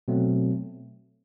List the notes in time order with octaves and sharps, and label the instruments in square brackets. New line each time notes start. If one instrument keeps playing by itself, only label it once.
[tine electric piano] B2 F#3 A3 C4